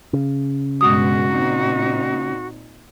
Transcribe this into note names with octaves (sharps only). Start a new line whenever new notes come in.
C#3
G2 B2 G#3 F#4 D#6
A#2 C4 D#4